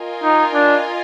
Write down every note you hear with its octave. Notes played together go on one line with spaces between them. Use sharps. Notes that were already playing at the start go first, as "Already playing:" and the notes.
Already playing: F4 A#4 D#5 G#5
D#4
D4